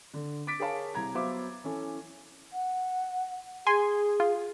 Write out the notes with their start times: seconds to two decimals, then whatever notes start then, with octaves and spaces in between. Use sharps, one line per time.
0.14 D3
0.47 D6 A6 B6 D7
0.60 G#4 A#4 C#5 F5 A5
0.94 C2 A#5 G#6
1.14 F#3 B3 C5 E5 F5 D6
1.64 E3 C#4 A4
2.53 F#5
3.67 G#4 G#5 C6
4.20 F4